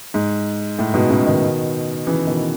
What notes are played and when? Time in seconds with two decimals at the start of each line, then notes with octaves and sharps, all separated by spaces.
0.14 G#2
0.79 A2
0.94 G#2 B2
1.10 A2 C#3
1.27 B2 D#3
2.07 C#3 E3
2.27 B2 D#3